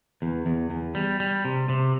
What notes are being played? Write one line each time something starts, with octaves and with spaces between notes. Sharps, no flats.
E2
E2
E2
G3
G3
C3
C3